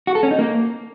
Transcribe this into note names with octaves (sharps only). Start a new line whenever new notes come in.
F#4
A4
C#4
D#4
A#3